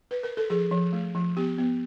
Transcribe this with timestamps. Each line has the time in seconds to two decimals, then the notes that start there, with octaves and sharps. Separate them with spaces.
0.11 B4
0.23 A#4
0.37 A4
0.50 F3 G#4
0.71 F3
0.93 A3
1.15 F3
1.37 B3 G4
1.58 B3